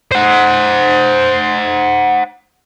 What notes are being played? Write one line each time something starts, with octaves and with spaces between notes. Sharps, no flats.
C5 F#5